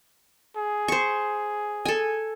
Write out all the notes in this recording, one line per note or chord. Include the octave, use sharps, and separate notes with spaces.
G#4
C5 C#6
A4 G#5